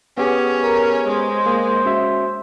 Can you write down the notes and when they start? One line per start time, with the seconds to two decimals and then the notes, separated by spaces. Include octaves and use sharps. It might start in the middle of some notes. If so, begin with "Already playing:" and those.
0.18 B3 C#4 G4 G#4
0.62 A#4
1.08 G#3 C5
1.46 A#3
1.85 C#4 F#4 E5